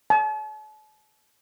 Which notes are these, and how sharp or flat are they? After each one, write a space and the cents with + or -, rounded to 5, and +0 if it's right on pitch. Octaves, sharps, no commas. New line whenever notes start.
A5 -45